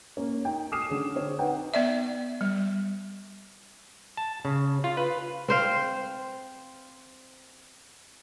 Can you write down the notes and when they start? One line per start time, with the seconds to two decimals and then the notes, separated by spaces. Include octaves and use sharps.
0.17 A#3 C#4
0.45 D#4 G5
0.72 D6 D#6 F6 C7 E7
0.89 D3 C#4 G#4
1.16 C4 C#5
1.38 D#4 B4 F#5 G5
1.74 B3 D5 E5
2.41 G3
4.17 A5
4.45 C#3
4.84 F4
4.97 B4
5.48 C4 C5 F5